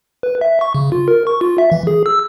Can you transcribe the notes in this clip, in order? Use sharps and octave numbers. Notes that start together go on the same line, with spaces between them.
B4
E5
C#6
C#3
F4
A#4
C#6
F4
E5
E3
G#4
E6